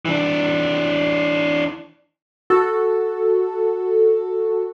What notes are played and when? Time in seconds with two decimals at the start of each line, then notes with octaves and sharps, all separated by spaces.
0.05 E3 D4
2.50 F#4 A4